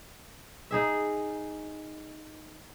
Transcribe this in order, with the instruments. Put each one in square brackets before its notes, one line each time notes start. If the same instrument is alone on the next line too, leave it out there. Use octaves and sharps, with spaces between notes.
[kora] D#4 G#4 E5